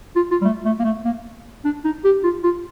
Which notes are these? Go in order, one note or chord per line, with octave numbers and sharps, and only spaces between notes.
F4
F4
G3
A3
A3
A#3
A3
A#3
D4
D#4
G4
F4
F4